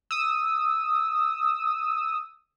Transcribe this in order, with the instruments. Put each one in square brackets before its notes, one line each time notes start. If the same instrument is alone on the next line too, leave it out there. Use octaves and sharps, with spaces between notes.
[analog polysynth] D#6 E6